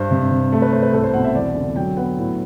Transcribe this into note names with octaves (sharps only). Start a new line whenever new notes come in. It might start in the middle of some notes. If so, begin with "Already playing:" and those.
Already playing: G2 C5
C3
C3
A3
B4
A3 C5
B4
C2 A4
C5
B2 F#5
E5
E2 D5
D3
F#3 G5
B3 F#5
A2